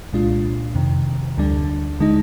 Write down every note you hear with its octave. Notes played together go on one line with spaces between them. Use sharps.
C2 A#2 G#3 D4 F4
F2 C3 D#3
D2 D3 G3 D4
D3 G#3 D#4